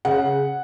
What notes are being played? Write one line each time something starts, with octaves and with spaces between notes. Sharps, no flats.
C#3 F#5